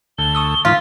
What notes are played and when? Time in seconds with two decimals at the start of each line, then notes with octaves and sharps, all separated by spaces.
0.18 D2 A4 G7
0.35 C#6 D#6 E6
0.65 G#2 E3 D#4 F4 B6